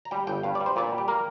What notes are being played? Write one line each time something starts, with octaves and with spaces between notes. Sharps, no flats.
A#5
G3 G5
G1 G5
G2 F5
G3 D5
C5
A#2 D5
G3
G4
A#3 A#4